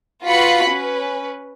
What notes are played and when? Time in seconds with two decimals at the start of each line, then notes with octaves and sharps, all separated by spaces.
0.24 F4 F#4 B4 B5 C#7
0.67 C#4 B4